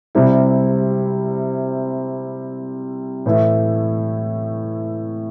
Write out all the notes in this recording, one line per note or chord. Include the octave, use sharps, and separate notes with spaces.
C3 G3 C4 E4
A2 E3 A3 E4